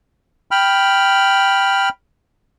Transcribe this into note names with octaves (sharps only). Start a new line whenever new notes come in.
G5 B5 F6